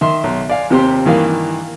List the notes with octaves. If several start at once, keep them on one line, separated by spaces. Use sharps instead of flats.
D#3 E5 C6
B1
D5 F5 G#5
D#2 C3 C4 G4 C5 C6
G2 D#3 E3 A#3 F5